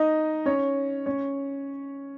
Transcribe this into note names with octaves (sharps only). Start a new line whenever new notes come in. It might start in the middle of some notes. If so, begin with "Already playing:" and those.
Already playing: D#4 D#5
C#4 C#5
C#4 C#5